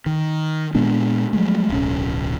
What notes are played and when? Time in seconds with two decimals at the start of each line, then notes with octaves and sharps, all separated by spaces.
0.06 D#3
0.75 A#2 G#3 B3 D4
1.33 F3 F#3 G#3 A3
1.70 D1 B1 C#4